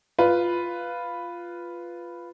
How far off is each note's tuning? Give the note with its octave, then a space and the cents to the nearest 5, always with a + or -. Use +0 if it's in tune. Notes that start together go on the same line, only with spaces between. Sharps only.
F4 +0 B4 +0